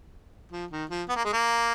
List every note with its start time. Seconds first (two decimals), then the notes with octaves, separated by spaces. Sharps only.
0.52 F3
0.71 D#3
0.90 F3
1.09 B3
1.16 A#3
1.25 G#3
1.33 A#3